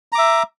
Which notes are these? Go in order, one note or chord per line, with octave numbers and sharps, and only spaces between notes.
E5 A#5 D6